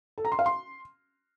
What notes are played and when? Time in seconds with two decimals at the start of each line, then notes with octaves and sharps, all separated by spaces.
0.18 A4
0.25 A#5
0.32 C6
0.39 F5
0.46 C6